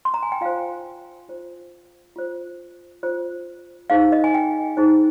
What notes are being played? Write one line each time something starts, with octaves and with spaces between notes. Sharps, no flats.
C6
A#5
G#5
G5
F4 C5 F5
F4 C5
F4 C5
F4 C5
D#4 G#4 C5 F5
D#5
G#5
G5
D#4 G#4 C5